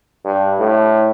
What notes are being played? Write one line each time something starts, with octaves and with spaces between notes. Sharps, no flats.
G2
A2